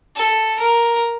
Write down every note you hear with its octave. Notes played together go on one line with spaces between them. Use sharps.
A4
A#4